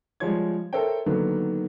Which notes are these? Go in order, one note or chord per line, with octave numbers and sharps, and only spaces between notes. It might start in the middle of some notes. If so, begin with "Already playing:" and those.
F3 G3 G#3 F4 C#5 G#6
A4 A#4 C5 C#5 E5 G5
D3 D#3 F#3 A#3 B3